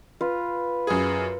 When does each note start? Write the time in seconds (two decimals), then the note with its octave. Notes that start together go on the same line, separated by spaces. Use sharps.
0.21 F4 B4
0.87 F#2 G#4